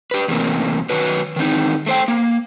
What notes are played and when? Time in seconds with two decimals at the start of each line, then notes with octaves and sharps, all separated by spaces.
0.11 G4 B4
0.28 E2 A2 C3 A#3
0.90 D#3 F#3 F#4 B4
1.36 D#3 E3 C4 D#4
1.86 A3 C5 G5
2.08 A#3